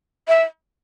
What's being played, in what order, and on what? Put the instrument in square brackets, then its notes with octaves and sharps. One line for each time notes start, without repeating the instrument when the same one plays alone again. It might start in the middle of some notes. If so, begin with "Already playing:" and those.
[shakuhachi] E5